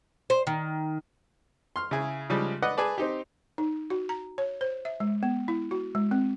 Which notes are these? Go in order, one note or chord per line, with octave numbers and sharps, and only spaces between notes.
C5
D#3
C6 F6
C#3 E4 G#4
C#3 F3 G3 G#3
B4 D5 D#5 F#5
G#4 B4 D5 A5
C4 D#4 G4
D#4
F#4
A#5
C#5
C5
E5
G#3
B3
E4
F#4
G#3
C4